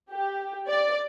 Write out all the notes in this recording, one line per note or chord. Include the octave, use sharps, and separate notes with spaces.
G4
D5